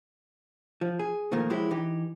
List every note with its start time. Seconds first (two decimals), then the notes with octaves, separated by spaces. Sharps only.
0.81 F3
0.99 G#4
1.31 A#2 D#3 F3 A3 A#3
1.50 F3 F#3 G#3 E4 G4
1.71 E3 D#4 G4